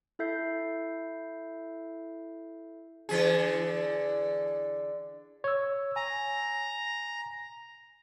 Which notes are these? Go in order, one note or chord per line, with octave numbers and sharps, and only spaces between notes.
E4 A4 E5 G6 C7
D3 E3 G#4
C#5 E6
G#5 A#5